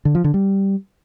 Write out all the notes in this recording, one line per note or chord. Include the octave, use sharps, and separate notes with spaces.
D3
F3
D3
G3